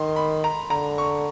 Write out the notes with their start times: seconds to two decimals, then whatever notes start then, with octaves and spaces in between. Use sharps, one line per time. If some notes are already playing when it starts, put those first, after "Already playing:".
Already playing: D#3 C6
0.16 B5
0.44 A#5
0.70 D3 A#5
0.98 C#6